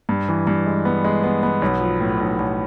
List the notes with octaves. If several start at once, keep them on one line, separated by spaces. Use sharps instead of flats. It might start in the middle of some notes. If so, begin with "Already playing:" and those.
G2
E3
G2
G#3
B3
G#3
B3
B3
B1
F3
A2
B1
B1